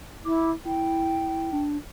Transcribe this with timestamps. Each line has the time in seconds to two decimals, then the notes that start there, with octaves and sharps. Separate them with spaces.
0.25 E4 D6
0.65 E4 G5
1.52 D4